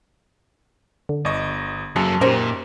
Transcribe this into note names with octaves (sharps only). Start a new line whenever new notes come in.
D3
G1 D5 D#5 C#6
F#2 F#3 A#3 G#4 A4
A#2 D#3 C#4 G4 A#4 C5